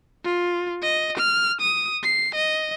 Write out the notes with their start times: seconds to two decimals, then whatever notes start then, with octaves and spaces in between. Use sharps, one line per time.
0.24 F4
0.82 D#5
1.17 F6
1.61 D#6
2.03 C7
2.34 D#5